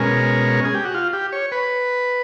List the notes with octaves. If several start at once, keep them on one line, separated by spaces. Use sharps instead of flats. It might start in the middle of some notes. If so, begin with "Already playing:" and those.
Already playing: B2 G#3 C#4 A#4
G#4
G4
F#4
F4
G4
C#5
B4